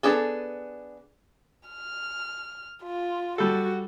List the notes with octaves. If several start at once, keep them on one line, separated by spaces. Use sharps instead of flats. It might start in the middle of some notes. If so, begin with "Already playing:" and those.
B3 D4 G#4 A4
F6
F4
G3 F#4 A4